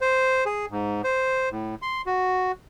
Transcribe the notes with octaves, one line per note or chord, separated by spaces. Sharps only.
C5
G#4
G#2
C5
A2
C6
F#4